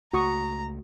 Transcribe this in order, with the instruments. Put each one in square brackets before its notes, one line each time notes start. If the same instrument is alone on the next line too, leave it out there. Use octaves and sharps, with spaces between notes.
[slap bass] C#2 A3 [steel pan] F#4 C#6 D#6 [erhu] A#5